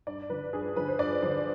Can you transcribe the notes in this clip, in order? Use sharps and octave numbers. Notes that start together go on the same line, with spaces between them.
G2 D5
D3 F3 B4
G2 G#4
D3 F3 B4
C5
G2 D5
D3 F3 C5